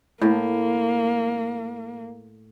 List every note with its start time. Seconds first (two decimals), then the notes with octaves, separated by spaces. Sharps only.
0.21 A2 A#3